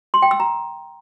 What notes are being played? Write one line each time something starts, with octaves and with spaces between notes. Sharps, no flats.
C6
G5
E6
A#5